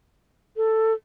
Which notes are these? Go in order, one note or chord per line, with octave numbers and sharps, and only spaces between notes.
A4